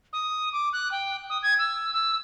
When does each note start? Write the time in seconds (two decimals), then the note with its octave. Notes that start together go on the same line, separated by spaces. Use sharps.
0.13 D#6
0.52 D6
0.73 F#6
0.91 G5
1.30 D#6
1.43 G#6
1.59 E6
1.94 E6